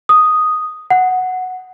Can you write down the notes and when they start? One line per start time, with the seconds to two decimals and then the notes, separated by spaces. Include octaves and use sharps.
0.09 D#6
0.90 F#5